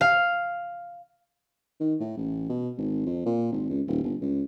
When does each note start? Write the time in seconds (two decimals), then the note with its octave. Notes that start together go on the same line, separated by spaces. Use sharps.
0.01 F5
1.80 D#3
2.00 A2
2.17 A1
2.49 B2
2.77 G#1
3.06 F2
3.26 A#2
3.52 G#1
3.69 C#2
3.88 D#1
4.04 G1
4.21 C#2